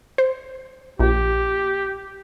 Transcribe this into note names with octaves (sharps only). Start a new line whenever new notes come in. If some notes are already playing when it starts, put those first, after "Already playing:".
C5
A#1 G4